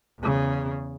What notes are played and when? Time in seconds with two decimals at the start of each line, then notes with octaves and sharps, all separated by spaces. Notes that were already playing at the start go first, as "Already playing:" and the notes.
0.20 E2 C#3